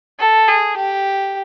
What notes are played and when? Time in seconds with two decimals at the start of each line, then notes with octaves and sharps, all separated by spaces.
0.19 A4
0.48 G#4
0.77 G4